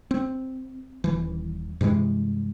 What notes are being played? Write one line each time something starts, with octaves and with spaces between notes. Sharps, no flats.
C4
D#1 E3
G2 C3 E3 G#3